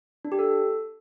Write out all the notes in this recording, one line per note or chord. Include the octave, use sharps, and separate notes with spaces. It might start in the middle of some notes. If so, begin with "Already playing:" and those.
D4
G4
A4